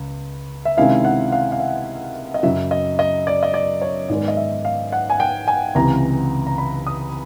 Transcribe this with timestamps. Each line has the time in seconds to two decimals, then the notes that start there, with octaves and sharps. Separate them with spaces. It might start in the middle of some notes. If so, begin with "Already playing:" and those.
Already playing: C#2
0.65 E5
0.77 C3 D#3 G#3 C#4 E4 F5
1.05 F#5
1.32 F5
1.52 F5
1.60 E5
2.34 D#5
2.43 F#2 C#3 F#3 E5
2.71 D#5
2.99 D#5
3.27 D5
3.43 D#5
3.54 D5
3.82 C#5
4.09 G#2 D#3 G#3 B3 D5
4.28 D#5
4.37 E5
4.65 F5
4.92 F#5
5.10 G#5
5.20 G5
5.48 G#5
5.75 C#2 C3 E3 A#5
6.47 A#5
6.58 B5
6.87 D#6